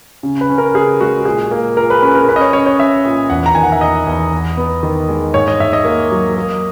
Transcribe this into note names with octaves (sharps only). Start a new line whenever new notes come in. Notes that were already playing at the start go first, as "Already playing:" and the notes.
C#3
B4
C#4
A#4
C#3 G#4
G#3 F#4
A#2 G#4
A#3
A#2 A#4
B4
C#4 B4
A#4
C#4 B4
D#5
C#5
C#4 C#5
C#5
C#4 E5
A#2
E2 F#5
A#5
D#3 G#5
F#5
E5
E2 D#5
E2
E2
B3
D#3
G#3
G#2 C#5
D#5
G#2 E5
D#5
A#3
F#3
A#3